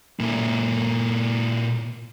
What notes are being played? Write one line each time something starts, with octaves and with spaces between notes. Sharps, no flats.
A#2 E4